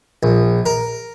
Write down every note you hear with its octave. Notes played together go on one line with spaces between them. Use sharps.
A#1
A#4